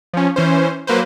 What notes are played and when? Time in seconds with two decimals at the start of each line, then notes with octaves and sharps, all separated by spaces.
0.14 F3 C#4
0.36 E3 C#4 C5
0.87 F#3 A#3 B4 C5